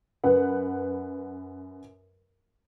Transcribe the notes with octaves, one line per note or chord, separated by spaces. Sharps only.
F#2 B4 F#5